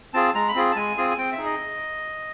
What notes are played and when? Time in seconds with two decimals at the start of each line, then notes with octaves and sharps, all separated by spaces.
0.14 C4 F4 G#4 A5
0.35 G#3 A#5
0.48 B5
0.55 C4 F4 G#4
0.72 A5
0.76 G#3 G#5
0.97 C4 F4 G#4
1.11 G#5
1.18 C4 G5
1.32 E5
1.38 D#4 G#4
1.46 D#5